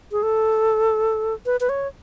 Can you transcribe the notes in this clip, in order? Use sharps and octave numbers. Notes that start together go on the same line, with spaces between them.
G#4
A4
B4
B4
C#5